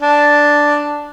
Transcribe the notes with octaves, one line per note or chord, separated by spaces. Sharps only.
D4